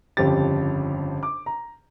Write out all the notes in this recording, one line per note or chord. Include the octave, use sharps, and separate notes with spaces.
G1 F2 C#3 G4 A6
D6
A#5